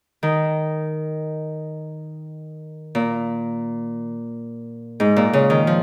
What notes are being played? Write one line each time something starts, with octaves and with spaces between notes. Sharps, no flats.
D#3
A#2
G#2
A#2
C#3
D#3
F3